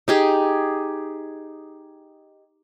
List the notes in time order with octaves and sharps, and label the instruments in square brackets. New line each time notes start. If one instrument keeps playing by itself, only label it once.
[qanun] D#4 G4 G#4